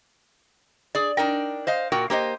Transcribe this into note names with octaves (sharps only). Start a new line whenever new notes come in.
G#4 D5
D4 D#4 A#4 G5
C5 D#5 F5
A#2 F#4 A#4 G5
A#3 G4 C5 D#5